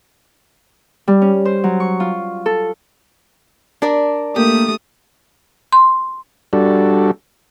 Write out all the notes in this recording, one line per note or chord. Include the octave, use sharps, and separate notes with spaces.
G3
C#4
C5
F#3
C#6
F4
A4
D4 A#4 D5
A3 A#3 G4 D#6
C6
G3 D4 F#4 A4